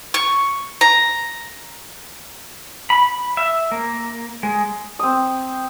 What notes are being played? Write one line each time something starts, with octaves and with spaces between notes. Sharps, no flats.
C#6
A#5
B5
E5
A#3
G#3
C4 D#6